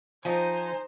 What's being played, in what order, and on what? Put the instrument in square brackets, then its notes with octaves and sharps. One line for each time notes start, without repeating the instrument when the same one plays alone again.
[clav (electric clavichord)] F3 D#5 [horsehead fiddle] D#4 [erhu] C5 [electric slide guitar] G#5